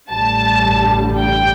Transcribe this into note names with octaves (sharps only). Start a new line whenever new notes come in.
A1 G2 D3 G3 A5
G5